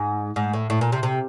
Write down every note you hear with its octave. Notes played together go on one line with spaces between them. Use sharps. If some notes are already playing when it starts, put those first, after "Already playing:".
Already playing: G#2
G#2
A2
A2
A#2
C3
C3